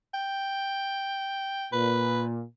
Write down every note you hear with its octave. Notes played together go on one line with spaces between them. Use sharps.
G5
A#2 B4